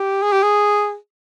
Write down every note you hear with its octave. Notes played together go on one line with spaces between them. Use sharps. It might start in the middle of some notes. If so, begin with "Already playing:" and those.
Already playing: G4
G#4
G4
G#4